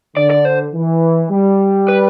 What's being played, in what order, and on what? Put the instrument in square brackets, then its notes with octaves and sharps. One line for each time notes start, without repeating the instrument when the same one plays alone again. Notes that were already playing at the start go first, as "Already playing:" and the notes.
[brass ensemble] D3 [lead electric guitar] D5
[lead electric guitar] D5
C5
[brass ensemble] E3
G3
[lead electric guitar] B4